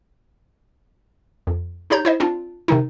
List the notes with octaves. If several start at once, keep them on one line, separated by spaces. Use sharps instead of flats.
F2
D4 D#4 G4 C#5 A#5 G6
E4 C5 D#5
C4 D4 F4
C3 D#3 D#4